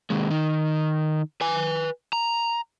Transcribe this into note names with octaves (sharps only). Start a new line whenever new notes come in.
D#2 G#3
D#3
B4 G#5
A#5